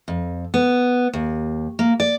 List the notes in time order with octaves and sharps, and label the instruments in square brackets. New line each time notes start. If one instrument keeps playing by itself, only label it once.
[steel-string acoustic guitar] F2
B3
D#2
A#3
D5